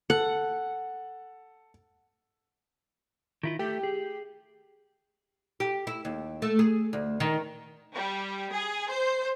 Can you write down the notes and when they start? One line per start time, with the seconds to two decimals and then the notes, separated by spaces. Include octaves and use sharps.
0.10 A4 F#5
3.43 D#3 E4 F4
3.59 A3 G4
3.83 G#4
5.60 G4
5.87 E4
6.05 D#2
6.42 A3
6.59 G#4
6.93 D2
7.20 D#3
7.93 G3
8.52 G#4
8.88 C5